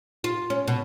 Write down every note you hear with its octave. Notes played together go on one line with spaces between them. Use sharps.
F4
C#4
B2